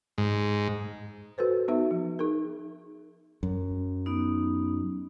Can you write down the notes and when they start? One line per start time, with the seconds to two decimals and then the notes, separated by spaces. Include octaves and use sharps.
0.18 G#2
1.38 F#4 A4 B4 C5
1.68 B3 D#4 F#4 E5
1.91 F3
2.19 D#4 G#4 A#4
3.43 F#2
4.06 B3 D#4